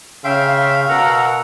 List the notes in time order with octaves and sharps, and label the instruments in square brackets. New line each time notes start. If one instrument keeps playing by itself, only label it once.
[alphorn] C#3 [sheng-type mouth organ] E5 G5 C6 [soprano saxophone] F5
[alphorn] B2 [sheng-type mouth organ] A#4 F#5 A#5 [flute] E6